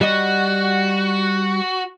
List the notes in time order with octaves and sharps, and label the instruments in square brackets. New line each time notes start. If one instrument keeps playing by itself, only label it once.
[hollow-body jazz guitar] G3 D#5 [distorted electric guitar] F#4